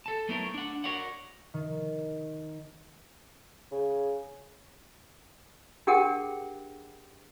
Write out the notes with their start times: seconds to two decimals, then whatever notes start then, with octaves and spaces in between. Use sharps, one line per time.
0.06 A4 A5
0.29 F#3 A3 B3 E4 A#4 C#5
0.54 D4 F#5
0.84 F#4 A#4 C#5 D5 F#5
1.54 D#3
3.72 C#3
5.87 D4 G4 G#4 A#4 F#5 G5